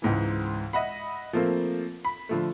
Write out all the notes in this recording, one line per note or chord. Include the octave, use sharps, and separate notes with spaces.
C#2 G#2 E3
D#5 E5 F#5 B5
F3 A3 A#3 C4
B5
D3 F3 A3